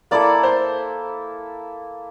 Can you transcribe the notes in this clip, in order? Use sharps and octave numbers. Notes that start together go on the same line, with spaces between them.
A#3 E4 A4 D5
C5